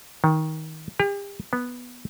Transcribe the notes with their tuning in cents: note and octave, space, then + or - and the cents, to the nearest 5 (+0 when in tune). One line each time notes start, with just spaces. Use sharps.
D#3 +20
G4 +40
B3 -5